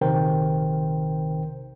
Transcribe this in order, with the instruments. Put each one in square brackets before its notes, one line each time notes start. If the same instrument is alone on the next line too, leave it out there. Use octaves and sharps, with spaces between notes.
[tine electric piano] A#1 C3 D#3 A#4 C5 G5